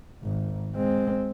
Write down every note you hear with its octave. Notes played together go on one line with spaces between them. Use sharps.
G#1
G#3 C4